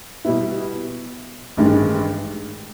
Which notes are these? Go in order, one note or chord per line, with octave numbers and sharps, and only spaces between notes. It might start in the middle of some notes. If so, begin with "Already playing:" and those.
B2 G3 B3 E4
A1 G2 D#3 G#3